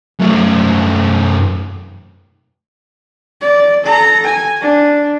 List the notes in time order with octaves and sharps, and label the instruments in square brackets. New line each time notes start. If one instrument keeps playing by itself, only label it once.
[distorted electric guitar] F#2 A3
[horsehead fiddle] D5
A4 A#5
G#5
D4